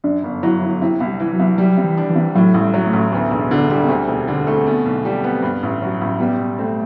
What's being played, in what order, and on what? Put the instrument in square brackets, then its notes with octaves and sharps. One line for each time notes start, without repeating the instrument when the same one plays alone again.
[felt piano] F#2 [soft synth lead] D4
[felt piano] G1
[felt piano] F#3 [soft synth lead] E4
[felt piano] G1
[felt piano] C3 [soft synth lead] E4
[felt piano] C2
[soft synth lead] G3
[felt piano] E3
[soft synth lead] F#3
[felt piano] C2
[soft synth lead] F#3 [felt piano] G3
[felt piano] C3
[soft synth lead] E3
[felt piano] D4
[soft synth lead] E3
[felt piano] C3
[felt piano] A2 [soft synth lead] F#3
[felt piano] A1
[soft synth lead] G3
[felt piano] F#3
[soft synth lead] A3
[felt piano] A1
[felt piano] D2 [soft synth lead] B3
[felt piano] E1
D3
G3
[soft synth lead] B3
[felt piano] D2 [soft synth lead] C4
[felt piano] E1
D3
A3
B2
B1
G3
B3
G2
A1
F#3
A1
[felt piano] G3 [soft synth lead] B3
[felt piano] B2
[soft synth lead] A3 [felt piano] C4